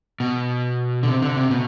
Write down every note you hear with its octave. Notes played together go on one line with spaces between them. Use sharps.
B2
D3
C3
D3
C3
B2